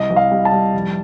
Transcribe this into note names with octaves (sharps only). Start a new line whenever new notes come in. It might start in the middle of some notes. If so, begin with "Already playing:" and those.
Already playing: C2 D#5
C2
F5
G3
A5
G3
F1